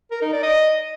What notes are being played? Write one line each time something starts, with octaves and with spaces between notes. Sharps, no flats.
A#4
D#4
D5
D#5